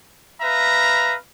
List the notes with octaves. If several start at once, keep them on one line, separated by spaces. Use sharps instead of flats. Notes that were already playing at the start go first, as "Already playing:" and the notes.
B4 E5 F5 A#5